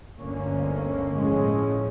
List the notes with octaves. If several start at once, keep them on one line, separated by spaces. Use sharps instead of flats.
G1 D2 D3 A#3 C#4
A2 F3 G#3 C#4